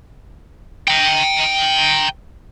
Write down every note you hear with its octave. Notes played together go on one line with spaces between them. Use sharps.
G5 A#5